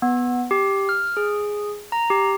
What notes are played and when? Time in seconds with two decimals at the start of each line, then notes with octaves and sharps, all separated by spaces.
0.02 B3
0.51 G4
0.89 F6
1.17 G#4
1.92 A#5
2.10 G4